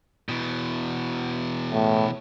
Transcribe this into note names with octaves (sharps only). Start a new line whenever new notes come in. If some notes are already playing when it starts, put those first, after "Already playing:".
B2 E3
A2